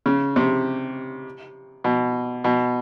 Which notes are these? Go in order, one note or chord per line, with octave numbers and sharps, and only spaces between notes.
C#3
C3
B2
B2